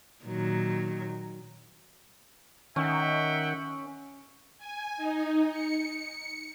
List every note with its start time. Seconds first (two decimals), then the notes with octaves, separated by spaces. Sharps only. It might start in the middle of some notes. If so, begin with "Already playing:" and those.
0.25 A#2 D#3 F#3
2.76 D#3 C#4 E5 F#5 G5
4.58 G#5
4.97 D#4
5.50 C#7